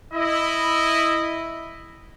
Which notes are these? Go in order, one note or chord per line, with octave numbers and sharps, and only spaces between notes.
E4 D#5